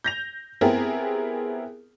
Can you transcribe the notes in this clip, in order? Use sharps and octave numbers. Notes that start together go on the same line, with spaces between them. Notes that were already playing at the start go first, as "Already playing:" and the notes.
G6 A#6 F7
B3 C4 E4 G4 G#4 A#4